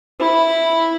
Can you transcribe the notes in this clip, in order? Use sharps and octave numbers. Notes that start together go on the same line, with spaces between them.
E4 B5